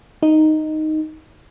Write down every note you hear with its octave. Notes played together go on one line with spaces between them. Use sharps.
D#4